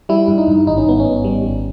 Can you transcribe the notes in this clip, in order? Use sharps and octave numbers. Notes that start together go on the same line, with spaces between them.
G3 E4
G2
D#4
G2
G#1 D#4
C#4
G#1 B3
C#4
G#1
G3
G#1